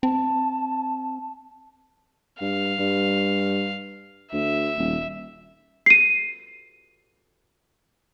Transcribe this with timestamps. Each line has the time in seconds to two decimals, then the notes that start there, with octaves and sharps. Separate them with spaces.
0.03 C4 A5
2.41 G2 F5
2.79 G2
4.33 D2 E5
4.77 D#1
5.86 C7 D#7